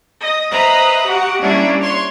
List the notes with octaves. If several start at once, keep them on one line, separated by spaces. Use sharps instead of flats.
D#5
B4 C5 D#5 E5 A#5 B5
F#4 G4 F#5
G3 A#3 C#4 D4 E4
C#5 C6